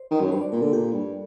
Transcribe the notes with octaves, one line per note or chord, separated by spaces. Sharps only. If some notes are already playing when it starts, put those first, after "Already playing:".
Already playing: C5
D#3
F#2
G2 C5
D5
A#2 A#4
D3 A4
A#2 G4
G2